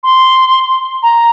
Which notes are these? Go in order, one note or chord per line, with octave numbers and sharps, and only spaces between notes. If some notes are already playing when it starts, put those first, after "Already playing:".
C6
A#5